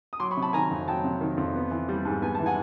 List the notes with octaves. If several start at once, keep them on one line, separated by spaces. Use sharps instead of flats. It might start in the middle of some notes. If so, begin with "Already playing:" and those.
D#6
F#3 C6 D6
B5 C#6
C3
A5 B5
D#3 G#5 A#5
F2
F#3 G5 A5
C3
D#3
F2
B3
E3
G3
G#2
B3 G#5
E3 A5
F#5 G#5